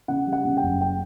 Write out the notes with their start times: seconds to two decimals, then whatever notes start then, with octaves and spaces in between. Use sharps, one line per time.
0.08 C#3 F#5
0.27 G3
0.33 F#5
0.45 C#3
0.57 G5
0.63 F#1
0.81 G5